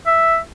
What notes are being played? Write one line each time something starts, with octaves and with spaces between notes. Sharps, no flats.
E5